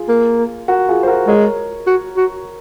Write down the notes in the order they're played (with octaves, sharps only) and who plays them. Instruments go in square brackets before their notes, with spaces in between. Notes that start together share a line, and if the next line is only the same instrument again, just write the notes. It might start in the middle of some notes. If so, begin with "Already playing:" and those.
Already playing: [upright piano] F4 G#4
[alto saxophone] A#3
[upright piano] F#4 A#4
F4 G#4
C5
F#4 A#4
[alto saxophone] G#3 [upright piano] A#4 C#5
[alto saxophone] F#4
F#4